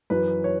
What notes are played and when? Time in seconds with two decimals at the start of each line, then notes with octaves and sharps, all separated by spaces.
0.10 F#2 E3 B4
0.44 C#5